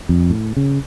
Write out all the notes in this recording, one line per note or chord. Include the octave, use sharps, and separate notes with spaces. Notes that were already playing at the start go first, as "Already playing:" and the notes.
F2
A2
C#3